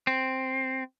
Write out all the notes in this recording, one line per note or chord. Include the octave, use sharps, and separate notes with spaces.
C4